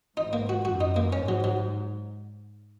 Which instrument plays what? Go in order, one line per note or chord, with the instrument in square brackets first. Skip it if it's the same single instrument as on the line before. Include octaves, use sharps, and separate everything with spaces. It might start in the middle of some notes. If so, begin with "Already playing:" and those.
[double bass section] G#2 [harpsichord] D#4
[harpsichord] A#3
F#4
[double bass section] F#2 [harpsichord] F#4
[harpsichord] D#4
A#3
[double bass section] G#2 [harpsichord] C#4
[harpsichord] F#3
F#3